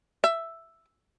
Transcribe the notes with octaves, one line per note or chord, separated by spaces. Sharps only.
E5